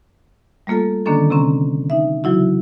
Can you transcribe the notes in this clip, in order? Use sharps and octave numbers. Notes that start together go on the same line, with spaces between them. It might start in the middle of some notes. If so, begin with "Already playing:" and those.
G3 A3 A#3 F4 A4
D3 D#3 A#3 C#4 D4 A4
C3 C4 C#4 A#5
D#4 E5
C#3 E3 F#3 E4 F#4